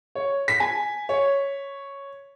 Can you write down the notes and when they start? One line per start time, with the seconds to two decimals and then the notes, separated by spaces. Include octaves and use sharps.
0.15 C#5
0.48 B6
0.60 G#5
1.09 C#5